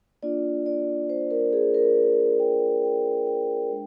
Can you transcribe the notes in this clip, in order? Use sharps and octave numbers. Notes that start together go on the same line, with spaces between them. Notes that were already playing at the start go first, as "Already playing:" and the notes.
A#3 D4 F4 D5
D5
C5
A#4
G#4
A#4
G5
G5
G5
G#3 D4